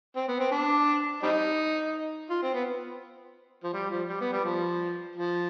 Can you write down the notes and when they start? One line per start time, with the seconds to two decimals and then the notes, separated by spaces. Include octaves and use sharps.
0.16 C4
0.28 B3
0.40 C4
0.51 D4
1.23 G3 C4 D#4
2.30 F4
2.43 C4
2.54 B3
3.64 F3
3.73 G3
3.90 F3
4.09 G3
4.21 B3
4.32 G3
4.44 F3
5.16 F3